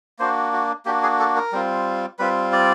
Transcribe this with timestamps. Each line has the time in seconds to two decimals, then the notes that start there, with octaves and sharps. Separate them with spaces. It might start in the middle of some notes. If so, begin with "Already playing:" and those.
0.19 A#3 D4 F#4 C5
0.53 F#4
0.85 A#3 D4 F#4 G4
1.03 G#4
1.19 A4
1.36 A#4
1.52 G3 C4 F4
2.19 G3 C4 F4 B4
2.52 D5